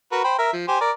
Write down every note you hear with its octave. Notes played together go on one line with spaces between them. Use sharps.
F#4 A#4 B4
C5 G5 B5
A#4 E5
F3
G4 C5 G#5
A#4 D5